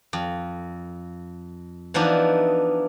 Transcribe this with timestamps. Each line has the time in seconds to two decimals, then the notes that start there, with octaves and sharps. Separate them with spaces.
0.13 F2
1.94 E3 F3 B3 D4 D#4